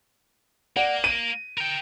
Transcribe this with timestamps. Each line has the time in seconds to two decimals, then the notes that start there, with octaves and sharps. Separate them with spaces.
0.76 A#3 D5 F#5
1.04 D#7
1.58 A#4 G5